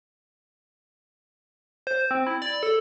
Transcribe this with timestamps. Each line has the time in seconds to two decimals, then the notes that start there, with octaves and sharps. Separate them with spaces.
1.87 C5
2.11 C4
2.27 E4
2.42 D5
2.63 A4